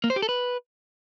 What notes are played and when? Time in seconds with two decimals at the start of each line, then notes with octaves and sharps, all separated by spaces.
0.04 A#3
0.10 C5
0.16 G4
0.22 A4
0.29 B4